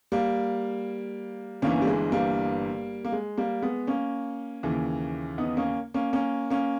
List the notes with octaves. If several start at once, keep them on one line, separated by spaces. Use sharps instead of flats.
G3 A#3
G1 G2 E3 A#3 C#4
G3
G#3
G3 A#3
A#3
G#3
G3 A#3
G#3 B3
A#3 C#4
D#2 C#3 E3
B3 D#4
A#3 C#4
A#3 C#4
A#3 C#4
A#3 C#4